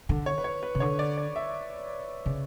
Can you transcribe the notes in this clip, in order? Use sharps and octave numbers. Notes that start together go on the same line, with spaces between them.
D3
C#5
B4
C#5
B4
C#3
D3 C#5
D5
D5
E5
C#3